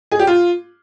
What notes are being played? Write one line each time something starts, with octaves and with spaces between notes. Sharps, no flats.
G#4
G4
F4